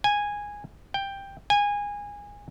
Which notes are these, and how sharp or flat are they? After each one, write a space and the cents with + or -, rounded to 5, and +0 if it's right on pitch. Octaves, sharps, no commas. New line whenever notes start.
G#5 -10
G5 +10
G#5 -20